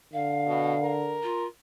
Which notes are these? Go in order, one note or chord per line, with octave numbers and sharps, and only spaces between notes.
D3 F5
B2
A#4
F4